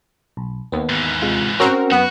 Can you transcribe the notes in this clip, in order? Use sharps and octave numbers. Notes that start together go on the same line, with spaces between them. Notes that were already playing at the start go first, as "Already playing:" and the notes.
B1
D#2 B3
G#2 E3
C3 G#3 F4
C4 C#4 F#4 A#4
F#2 B3 F#4